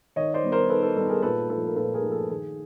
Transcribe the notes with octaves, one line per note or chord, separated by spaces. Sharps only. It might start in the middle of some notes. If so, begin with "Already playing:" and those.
D#3 C#5 D#5
C5 D5
G3 B3
A#4 C5
D#3 A4 B4
A4
G3 B3 A4
G#4 A#4
A#2 A4 B4
F3 A3 A4 B4
A#4
A#2 A4 B4
G#4 A#4
F3 A3
A4
D#3 G#4